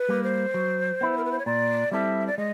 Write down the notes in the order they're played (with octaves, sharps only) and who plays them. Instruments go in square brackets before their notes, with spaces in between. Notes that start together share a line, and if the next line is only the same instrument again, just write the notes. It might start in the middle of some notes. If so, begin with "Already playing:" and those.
Already playing: [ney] B4
[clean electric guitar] G3 A#3
[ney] C5
[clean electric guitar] F#3
B3 E4
[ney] A#4
B4
C5
C#5
[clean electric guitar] A#2 [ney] D5
[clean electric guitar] G3 C4 E4 A4 [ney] E5
[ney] D5
[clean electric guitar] G#3 [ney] D#5